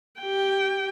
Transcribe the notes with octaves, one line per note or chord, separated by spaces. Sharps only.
G4 G5